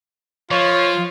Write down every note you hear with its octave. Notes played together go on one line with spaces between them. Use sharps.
F3 F4 C#5